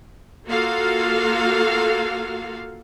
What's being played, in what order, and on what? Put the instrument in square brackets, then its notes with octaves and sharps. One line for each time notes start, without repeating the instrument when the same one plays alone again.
[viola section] A#3 F4 F#4 A4 F5